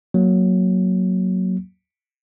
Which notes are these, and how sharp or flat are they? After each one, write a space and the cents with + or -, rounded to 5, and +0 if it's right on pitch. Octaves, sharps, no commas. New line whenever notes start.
F#3 +0 A#3 +0